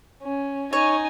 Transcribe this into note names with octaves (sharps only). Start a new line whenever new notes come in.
C#4
D#4 C#5 G#5